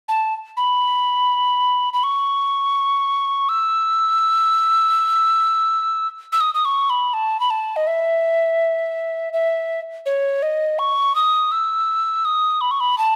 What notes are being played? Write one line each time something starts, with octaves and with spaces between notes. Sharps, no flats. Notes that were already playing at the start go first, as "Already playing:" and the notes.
A5
B5
B5
C#6
E6
E6
D#6
D#6
C#6
B5
A5
B5
A5
D#5
E5
E5
C#5
D#5
C#6
D#6
E6
D#6
B5
C#6
B5
A5